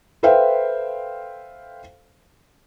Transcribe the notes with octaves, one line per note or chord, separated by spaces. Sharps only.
A4 B4 C5 E5 F5 G5